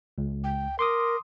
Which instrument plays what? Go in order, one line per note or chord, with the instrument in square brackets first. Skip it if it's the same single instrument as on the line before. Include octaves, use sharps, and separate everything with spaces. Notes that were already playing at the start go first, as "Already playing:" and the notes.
[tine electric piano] C#2
[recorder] G5
[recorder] A#4 [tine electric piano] C6 D6 D#6